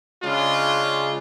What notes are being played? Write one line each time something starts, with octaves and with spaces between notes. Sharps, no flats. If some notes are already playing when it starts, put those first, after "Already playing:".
C#3 G#3 D4 F4